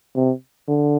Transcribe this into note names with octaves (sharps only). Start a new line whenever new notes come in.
C3
D3